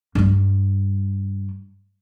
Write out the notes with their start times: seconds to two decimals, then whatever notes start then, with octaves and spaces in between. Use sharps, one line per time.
0.15 G2 G3